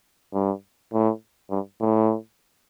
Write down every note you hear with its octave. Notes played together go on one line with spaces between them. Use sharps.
G2
A2
G2
A2